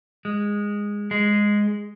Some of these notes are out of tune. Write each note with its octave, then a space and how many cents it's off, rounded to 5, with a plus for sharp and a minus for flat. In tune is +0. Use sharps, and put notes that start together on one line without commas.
G#3 -15
G#3 -5